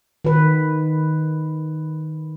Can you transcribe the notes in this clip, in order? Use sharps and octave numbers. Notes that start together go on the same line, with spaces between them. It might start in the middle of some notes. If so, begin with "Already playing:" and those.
D#3 B4